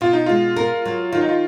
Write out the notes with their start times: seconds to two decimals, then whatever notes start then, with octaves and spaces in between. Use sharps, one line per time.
0.01 B2 F4
0.13 D#4
0.26 G#3 F4
0.56 A#4
0.85 F#3
1.12 D#3 F4
1.21 D#4
1.29 F4